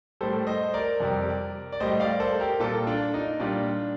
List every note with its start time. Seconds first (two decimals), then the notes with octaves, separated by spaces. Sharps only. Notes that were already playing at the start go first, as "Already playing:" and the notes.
0.21 A2 G3 A4 C5
0.47 C5 D#5
0.74 A#4 D5
1.00 F2 C3 G3
1.72 D5
1.80 A2 G3 C5 D#5
2.00 D5 F5
2.20 A4 C5
2.40 G4 A#4
2.60 A#2 G3 F4 A4
2.87 D4 F4
3.14 D#4
3.40 A#2 G3 D4 F4